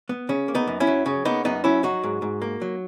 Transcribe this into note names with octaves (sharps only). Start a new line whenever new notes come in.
B3
C#3 C#4
A#3
B3 D#4
F#2
C#4 E4
F#3
C#3 C#4
A#3 B3 D#4
F#2 B3 D#4
F#3 C#4 E4
F#3 D#4 F#4
G#2
G#2
A#3
F#3